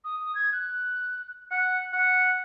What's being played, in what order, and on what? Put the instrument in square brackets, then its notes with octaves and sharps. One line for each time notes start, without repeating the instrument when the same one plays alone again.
[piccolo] D#6
G#6
F#6
[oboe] F#5 [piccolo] C#7
[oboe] F#5 [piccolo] C#7